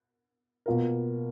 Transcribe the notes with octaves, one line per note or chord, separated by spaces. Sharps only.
B2 A#3 F4 A#4